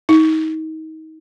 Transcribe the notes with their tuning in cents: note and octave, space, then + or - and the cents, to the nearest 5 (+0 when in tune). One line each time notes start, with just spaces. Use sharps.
D#4 +30